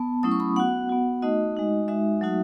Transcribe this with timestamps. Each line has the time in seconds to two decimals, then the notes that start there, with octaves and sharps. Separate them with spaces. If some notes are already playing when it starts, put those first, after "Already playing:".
Already playing: B3 A5
0.23 F#3 A3 C#4 E4 D#6
0.32 C#6
0.40 B5
0.56 B3 F#4 F#5
0.89 B3 F#4
1.22 A3 D#4 F#4 D#5
1.55 G#3 D#4 F#4
1.88 G#3 D#4 F#4 E5
2.21 F#3 A3 D#4 F#4